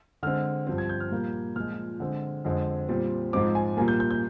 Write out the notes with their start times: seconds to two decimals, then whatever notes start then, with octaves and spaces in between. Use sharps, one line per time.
0.23 D3 G#3 C4 F6
0.67 G2 F3 C4
0.78 G#6
0.89 G6
1.00 F6
1.12 A#2 G3 A#3
1.56 A#2 F3 G#3 F6
2.00 D3 G#3 C4
2.45 F2 D3 G#3 C4
2.89 A#2 G3 C4
3.33 G#2 F3 G#3 C4 D6
3.55 G#5
3.77 A#2 G3 A#3 G#5
3.88 G6
4.00 G6
4.11 G6